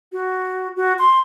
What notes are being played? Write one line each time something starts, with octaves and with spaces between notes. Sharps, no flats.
F#4
F#4
C6